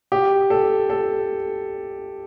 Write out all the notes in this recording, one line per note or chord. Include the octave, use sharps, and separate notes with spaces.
G4
A4
A4